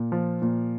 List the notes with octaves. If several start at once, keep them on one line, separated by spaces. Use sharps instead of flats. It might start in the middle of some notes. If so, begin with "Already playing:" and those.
Already playing: A#2
F3
A#2